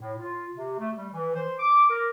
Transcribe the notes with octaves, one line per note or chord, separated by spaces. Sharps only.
A2
F4
C3
A3
G3
E3
C5
D6
A#4